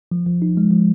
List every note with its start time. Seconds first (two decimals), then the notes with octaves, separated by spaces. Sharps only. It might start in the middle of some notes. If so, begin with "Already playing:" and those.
0.11 F3
0.26 F3
0.42 D#4
0.57 G#3
0.71 F3